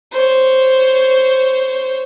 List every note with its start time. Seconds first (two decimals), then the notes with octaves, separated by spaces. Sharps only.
0.12 C5 C#5